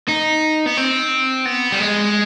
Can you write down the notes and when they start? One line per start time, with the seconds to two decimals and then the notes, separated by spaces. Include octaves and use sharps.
0.08 D#4
0.66 B3
0.77 C4
1.45 B3
1.72 G3
1.80 G#3